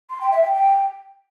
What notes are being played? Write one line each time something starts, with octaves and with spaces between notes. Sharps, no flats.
C6
G5
E5
G5
G5